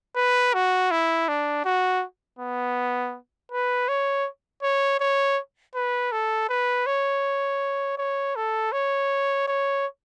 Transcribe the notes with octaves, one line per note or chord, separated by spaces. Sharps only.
B4
F#4
E4
D4
F#4
B3
B4
C#5
C#5
C#5
B4
A4
B4
C#5
C#5
A4
C#5
C#5